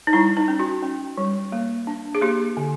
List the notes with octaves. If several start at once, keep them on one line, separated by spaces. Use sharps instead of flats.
D#4
G3 E4
D#4
C#4
F#4
C#4
G3
A#3
D4
G#4
A#3 G4
D3